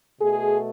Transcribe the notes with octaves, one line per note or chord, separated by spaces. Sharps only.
B2 A3 G#4